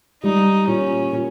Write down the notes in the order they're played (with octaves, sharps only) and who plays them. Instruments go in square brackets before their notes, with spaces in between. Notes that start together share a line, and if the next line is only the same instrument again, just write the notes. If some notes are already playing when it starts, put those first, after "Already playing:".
[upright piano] G3 [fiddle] D#4
[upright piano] A#2 [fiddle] C#4
[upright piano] A#2